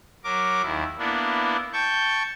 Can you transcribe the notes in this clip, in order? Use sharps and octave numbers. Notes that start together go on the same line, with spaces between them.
F#3 A#4 D6
D#2 E4
A#3 B3 D4 E4
G5 A5 C#6 G6